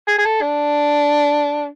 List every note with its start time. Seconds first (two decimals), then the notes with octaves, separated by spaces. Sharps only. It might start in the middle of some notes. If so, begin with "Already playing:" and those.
0.07 G#4
0.18 G#4
0.25 A4
0.41 D4